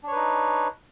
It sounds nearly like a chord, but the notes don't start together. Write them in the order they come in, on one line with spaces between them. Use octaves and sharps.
D4 C#5 B4 D#4